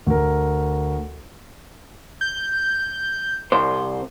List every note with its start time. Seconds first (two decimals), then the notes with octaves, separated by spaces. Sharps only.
0.07 D2 A#4
2.21 G6
3.52 C2 C5